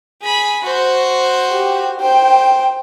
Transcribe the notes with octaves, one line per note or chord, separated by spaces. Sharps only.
G#4 B5
F#4 C5
G4
C5 G5